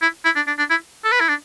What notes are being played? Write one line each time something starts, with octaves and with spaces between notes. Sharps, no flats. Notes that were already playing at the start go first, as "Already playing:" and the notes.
E4
E4
D4
D4
D4
E4
A4
B4
E4
D4